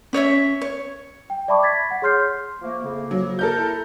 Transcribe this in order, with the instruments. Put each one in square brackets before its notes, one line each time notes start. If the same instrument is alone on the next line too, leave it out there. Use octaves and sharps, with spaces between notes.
[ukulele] C#4 C#5 D5 E5
C#5
[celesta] G5
D5 E5 A5 B5 C#6 D6
G#6 A6 B6
F#5
G#4 C#5 C6 F6 G6 C7
[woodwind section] F3 A3 A#3
F2 C#3 A#3
[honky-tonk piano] F#3
A4 A#4 G6
[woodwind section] E4